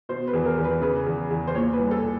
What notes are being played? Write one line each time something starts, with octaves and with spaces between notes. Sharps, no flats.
B2 C5
B4
E2
A#4
E2
B4
C#3 B4
E2
E2
C5
A#2 C#5
B4
C2
A4